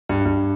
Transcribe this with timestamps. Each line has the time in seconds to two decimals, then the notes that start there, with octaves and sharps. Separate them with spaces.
0.09 G2
0.25 G2